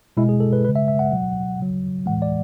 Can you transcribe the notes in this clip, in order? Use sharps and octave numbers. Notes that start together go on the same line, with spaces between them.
B2 G#3 E4
G#4
A4
B4
C#3 G#3 B4
E5
E5
F#5
B2 F#3
C#3 F#3
A2 E3 G#3 F#5
D5